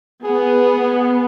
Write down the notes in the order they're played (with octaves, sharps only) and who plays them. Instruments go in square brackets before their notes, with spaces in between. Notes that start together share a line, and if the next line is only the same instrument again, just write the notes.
[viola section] B3 [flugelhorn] G#4